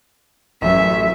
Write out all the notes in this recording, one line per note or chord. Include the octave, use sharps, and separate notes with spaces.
A1 F#2 E5